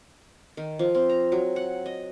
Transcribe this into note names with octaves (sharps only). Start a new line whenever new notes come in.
D#3
F3
C4
A#5
F#3
F#5
D#5